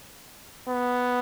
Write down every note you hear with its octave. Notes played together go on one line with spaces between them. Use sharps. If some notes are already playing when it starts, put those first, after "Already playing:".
B3